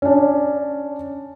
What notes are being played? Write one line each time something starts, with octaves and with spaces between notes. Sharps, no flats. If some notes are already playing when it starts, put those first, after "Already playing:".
C#4 D4